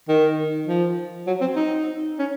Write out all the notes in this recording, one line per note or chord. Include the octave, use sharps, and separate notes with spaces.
D#3
F3
F#3
C4
D#4
C#4